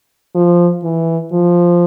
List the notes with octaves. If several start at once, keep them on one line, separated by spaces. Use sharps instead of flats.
F3
E3
F3